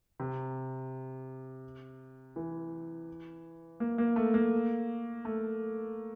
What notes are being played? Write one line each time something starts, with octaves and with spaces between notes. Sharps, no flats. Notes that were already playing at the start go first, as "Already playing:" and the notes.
C3
E3
A#3
A#3
A3
A#3
A3